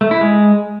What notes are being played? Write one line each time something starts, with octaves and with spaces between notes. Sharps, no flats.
A3
E4
G#3